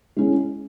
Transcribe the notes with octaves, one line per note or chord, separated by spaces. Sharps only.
G#3 C#4 E4